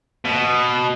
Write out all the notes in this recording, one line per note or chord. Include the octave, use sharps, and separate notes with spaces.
B2